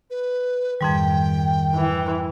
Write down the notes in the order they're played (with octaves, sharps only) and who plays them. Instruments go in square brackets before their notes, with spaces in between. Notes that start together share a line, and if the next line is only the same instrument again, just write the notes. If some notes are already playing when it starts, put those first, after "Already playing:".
[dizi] B4
[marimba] F2 G#2 G3 [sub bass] D#3 [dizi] G5
[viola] E3